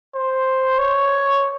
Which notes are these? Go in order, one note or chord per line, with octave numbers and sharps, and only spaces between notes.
C5
C#5